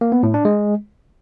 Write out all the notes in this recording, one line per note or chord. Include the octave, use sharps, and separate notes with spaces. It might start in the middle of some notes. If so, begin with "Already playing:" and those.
A#3
B3
A2
D4
G#3